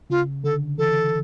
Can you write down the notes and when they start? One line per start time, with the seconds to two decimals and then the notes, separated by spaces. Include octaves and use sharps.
0.10 C#3 F4
0.44 D3 A4
0.78 E3 A4